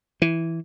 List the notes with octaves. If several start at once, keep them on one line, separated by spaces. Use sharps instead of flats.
E3